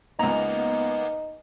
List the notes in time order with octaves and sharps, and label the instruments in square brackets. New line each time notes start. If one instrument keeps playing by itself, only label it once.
[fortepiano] C#2 A#5 [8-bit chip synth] A#3 B3 [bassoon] D#4